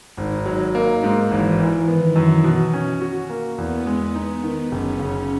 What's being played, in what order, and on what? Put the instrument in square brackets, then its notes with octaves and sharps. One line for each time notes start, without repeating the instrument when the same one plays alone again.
[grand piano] G#1 [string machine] D#4
[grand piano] F#3
A#3
G#2
[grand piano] G#1 [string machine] E3
[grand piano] E3
[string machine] D#3 [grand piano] B3
[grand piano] F#2
B2
C#4
F#4
A#3
[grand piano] E2 [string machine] B3
[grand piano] G#3
D#4
D#3
[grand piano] F#1 [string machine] C#4
[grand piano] C#3